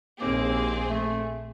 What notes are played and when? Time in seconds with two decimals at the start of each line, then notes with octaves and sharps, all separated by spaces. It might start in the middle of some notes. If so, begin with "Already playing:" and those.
0.19 A#1 D#2 A#3 C4 G#4 D6
0.89 A3